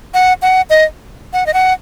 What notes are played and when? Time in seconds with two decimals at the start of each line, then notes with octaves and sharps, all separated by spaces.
0.14 F#5
0.42 F#5
0.70 D#5
1.33 F#5
1.46 D#5
1.54 F#5